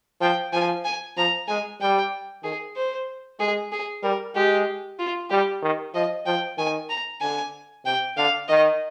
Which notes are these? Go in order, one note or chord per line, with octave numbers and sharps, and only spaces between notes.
F3 G5
F3 G#5
G#5
F3 A#5
G#3 G#5
G3 G5
D#3 G#4
C5
G#3 G#4
G#4
G3 A#4
G#3 G4
F4
G3 G4
D#3
F3 D#5
F3 G5
D#3 G#5
A#5
D3 G#5
C3 G5
D3 F5
D#3 D#5